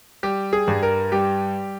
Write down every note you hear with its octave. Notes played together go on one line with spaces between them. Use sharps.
G3 G4
G#4
G2
A#4
G3 G4